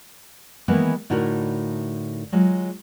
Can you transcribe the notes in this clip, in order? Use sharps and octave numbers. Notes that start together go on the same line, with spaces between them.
D#3 E3 G#3 A#3 B3 B4
A2 D3 D#4 E4 F#4 A#4
F#3 G#3 F4